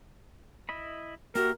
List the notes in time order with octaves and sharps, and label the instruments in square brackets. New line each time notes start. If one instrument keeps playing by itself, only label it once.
[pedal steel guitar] E4 D#5 B5
[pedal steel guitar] A#3 G4 E5 [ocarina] F#4 [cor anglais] A#4